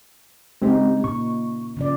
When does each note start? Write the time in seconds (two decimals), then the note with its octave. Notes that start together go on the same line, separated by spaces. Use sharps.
0.62 C#3 G#3 C4 D#4 G4
1.04 A#2 C#6
1.77 C#3 F3 D5